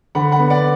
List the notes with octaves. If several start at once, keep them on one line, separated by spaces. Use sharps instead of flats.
D3 F#5 B5
F#5 B5
B3
D5 F#5